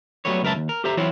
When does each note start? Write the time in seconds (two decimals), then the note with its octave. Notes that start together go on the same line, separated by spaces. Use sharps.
0.25 F#3 G3 A3 B3 C#5
0.43 C#2 F#2 A#4 B4 E5 A5
0.55 D#2
0.69 A#4
0.84 G4 A4 C5 E5 A#5
0.97 E3 F#3 C4 E4 F4 C#5